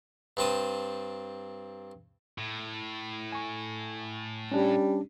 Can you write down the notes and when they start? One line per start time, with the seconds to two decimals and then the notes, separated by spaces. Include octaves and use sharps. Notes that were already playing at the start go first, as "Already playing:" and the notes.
0.37 G2 C4 A5 D#6
2.38 A2
3.32 G#5 C#6
4.52 G3 C#4 D4 G4